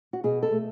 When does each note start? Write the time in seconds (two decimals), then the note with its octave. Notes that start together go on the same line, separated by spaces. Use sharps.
0.13 F#4
0.24 B2 G#4
0.43 A4
0.51 A3